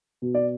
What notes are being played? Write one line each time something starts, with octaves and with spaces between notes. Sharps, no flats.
B2
D5